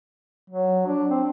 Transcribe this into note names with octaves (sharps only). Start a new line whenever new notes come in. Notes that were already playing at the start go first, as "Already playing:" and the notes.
F#3
D4
C4